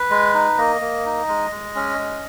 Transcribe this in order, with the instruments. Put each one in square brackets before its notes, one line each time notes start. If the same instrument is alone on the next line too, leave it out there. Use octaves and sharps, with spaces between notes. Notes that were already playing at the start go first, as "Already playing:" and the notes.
Already playing: [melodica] B4
G#3
D#4
A#3 D#5
A#3
D#4
G#3
G#3
C#4
G#3